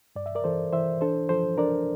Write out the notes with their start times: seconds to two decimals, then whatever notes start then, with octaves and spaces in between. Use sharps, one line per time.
0.16 G2 D5
0.26 E5
0.35 A#4 D5
0.44 E3 A4 C5
0.73 E3 C5 E5
1.01 D4 A4 C5
1.29 F3 A4 C5
1.58 D4 A#4 D5